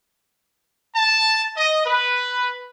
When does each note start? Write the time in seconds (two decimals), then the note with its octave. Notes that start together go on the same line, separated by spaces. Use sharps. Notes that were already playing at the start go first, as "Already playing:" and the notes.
0.96 A5
1.57 D#5
1.86 B4